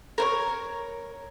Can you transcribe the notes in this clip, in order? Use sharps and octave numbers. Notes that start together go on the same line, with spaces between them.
A#4 C5 C#5